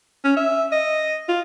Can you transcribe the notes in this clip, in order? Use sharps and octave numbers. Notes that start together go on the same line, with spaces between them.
C#4
E5
D#5
F4